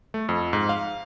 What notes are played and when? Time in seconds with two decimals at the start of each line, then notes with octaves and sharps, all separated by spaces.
0.14 A3
0.29 F2
0.53 G#2
0.69 F5